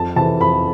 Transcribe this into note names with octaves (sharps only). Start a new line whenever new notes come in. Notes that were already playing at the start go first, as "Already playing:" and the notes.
Already playing: F2 A5
C3 E3 A5
F2 B5